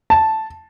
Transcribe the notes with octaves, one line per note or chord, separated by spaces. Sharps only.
A5